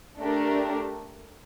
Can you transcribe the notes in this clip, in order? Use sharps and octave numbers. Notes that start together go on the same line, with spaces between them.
A3 D4 G4 A#4